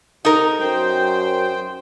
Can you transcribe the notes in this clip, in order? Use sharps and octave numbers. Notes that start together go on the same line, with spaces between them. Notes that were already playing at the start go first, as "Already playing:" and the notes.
C3 D#4 A#4
F#2 C5 G5